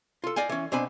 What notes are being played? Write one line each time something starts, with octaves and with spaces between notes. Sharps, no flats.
F4 A4
D5 D#5 F5 G5 G#5
E3 C#4
B2 C4 D4 G#5 B5